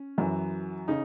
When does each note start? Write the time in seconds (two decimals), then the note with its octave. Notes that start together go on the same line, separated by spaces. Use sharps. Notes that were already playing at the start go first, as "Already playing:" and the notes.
Already playing: C#4
0.18 F#2 E3
0.88 C#3 D#4